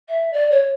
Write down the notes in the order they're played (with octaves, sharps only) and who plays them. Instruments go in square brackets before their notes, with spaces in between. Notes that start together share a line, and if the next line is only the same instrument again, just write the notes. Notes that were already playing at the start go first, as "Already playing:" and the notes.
[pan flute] E5
D5
C#5